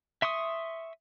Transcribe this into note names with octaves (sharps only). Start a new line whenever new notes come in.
E5 C6 C#6 D#6